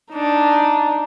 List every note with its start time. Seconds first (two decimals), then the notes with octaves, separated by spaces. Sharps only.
0.11 D4 D#4